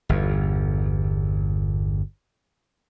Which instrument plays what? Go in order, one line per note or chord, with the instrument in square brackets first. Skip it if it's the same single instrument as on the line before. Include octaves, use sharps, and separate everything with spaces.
[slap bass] G1 E2